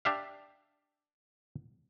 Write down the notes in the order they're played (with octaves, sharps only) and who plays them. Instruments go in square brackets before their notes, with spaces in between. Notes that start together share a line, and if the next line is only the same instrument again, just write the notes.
[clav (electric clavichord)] D4 G4 E5 F5